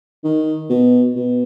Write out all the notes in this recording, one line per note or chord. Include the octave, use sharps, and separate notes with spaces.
D#3
B2
B2